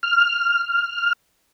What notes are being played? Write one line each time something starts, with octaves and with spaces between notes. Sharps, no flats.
F6